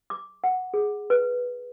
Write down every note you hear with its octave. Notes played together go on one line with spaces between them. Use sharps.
D6
F#5
G#4
B4